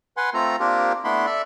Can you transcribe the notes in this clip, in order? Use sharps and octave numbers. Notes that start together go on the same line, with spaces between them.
B4 F#5 G#5 C6
A3 C4 F4 A4 A#5
A#3 C4 D4 F4 G4 A#4
A3 B3 D4 E4 B5 C6
A4 D5 E5